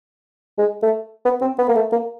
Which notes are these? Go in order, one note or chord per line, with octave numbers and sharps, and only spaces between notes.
G#3
A3
B3
C4
B3
A#3
A3
A#3